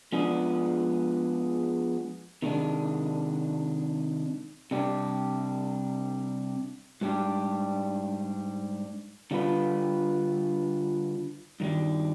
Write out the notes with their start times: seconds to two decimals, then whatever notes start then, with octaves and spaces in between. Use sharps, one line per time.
0.12 F3 G#3 B3 D4 G#4
2.42 C3 D#3 G#3 D4
4.71 C3 G3 D4 G4
7.01 G#2 G3 D4 G4
9.31 D3 G3 D4 F4 B4
11.60 G2 D#3 G3